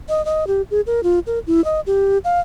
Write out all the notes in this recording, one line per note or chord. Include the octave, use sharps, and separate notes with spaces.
D#5
D#5
G4
G#4
A#4
F4
A#4
E4
D#5
G4
F5